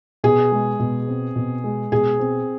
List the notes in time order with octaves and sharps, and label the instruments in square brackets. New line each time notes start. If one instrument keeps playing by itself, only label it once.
[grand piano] B2 [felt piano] G#4
[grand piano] G#3
B2
C4
B2
G#3
[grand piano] B2 [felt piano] G#4
[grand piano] C4